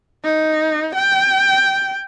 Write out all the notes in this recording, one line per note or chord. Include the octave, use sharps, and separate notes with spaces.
D#4
G5